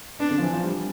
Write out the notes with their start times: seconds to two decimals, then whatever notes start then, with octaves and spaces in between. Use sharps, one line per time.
0.20 B3 D4
0.31 D3
0.38 F3
0.42 E3
0.53 F3
0.64 G3